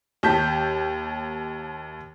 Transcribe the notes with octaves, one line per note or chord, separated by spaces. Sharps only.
D#2 A5 G6 B6